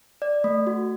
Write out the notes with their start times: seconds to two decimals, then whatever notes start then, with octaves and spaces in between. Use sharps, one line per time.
0.22 D5
0.44 A3
0.67 F#4